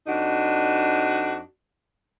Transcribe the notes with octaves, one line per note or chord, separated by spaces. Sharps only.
F2 D4 D#4 F#4